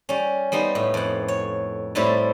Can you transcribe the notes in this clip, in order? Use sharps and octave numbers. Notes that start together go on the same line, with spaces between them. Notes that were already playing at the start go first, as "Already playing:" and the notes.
G3 C#4
G3 B3 D#4 C6
A2
F2 F#5
C#5
A2 G3 C4 E4 B4 A5